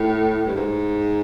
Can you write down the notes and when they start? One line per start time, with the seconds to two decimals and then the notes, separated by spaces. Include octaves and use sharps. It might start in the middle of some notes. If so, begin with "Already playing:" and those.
Already playing: A2
0.47 G2
0.56 G#2